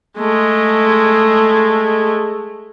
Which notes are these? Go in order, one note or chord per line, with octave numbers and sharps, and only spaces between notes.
G#3 A3